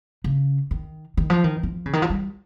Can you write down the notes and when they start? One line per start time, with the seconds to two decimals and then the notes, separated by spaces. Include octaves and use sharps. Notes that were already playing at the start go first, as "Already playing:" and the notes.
0.24 C#3
0.71 D#3
1.17 D#3
1.30 F3
1.44 D#3
1.63 F3
1.86 C#3
1.93 D#3
2.02 F3
2.10 G3